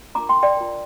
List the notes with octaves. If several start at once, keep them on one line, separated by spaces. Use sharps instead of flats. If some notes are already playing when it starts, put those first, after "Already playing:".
D4 F4 A#4 A#5 D6
G5 C6
D5 G5
F4 A#4